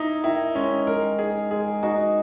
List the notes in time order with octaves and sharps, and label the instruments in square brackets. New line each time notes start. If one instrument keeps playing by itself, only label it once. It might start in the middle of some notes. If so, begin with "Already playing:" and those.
Already playing: [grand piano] D#4 E4
[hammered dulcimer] D#3 [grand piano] E4
[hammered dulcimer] G#3 [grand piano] C#4
[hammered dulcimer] G#3 [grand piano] A#4
[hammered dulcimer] D#4 [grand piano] G#4
[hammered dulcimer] G#3 [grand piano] G#4
[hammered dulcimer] D#4 [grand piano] F#4